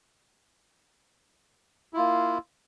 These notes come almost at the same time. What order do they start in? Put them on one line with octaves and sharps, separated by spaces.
E4 F4 A#3